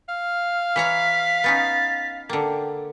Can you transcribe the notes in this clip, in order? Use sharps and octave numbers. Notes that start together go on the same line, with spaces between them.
F5 F6
E3 C#5 A#5 B6
B3 C#4 D#4 A6
D3 A#3 G5